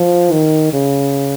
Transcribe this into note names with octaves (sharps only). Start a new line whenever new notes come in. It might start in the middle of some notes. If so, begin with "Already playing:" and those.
Already playing: F3
D#3
C#3